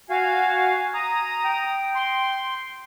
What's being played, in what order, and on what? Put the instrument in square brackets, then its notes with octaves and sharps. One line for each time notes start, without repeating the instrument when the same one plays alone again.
[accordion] F#4 F5 [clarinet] G#5
[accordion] A#5 D#6
[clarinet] G5
[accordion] C6